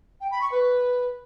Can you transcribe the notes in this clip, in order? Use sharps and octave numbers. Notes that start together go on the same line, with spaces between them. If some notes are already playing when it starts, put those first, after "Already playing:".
G5
B5
C#6
B4